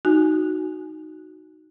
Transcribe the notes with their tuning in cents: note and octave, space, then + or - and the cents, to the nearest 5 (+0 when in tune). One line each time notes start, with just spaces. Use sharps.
D#4 +0 F#4 +0 G#5 +10